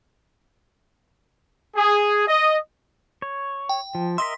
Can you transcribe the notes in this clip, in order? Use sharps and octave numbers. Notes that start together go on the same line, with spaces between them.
G#4
D#5
C#5
G5
F3
A#4 D#5 E5 C6 B6